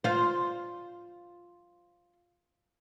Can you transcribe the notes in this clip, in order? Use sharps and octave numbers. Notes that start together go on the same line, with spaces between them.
F4 C5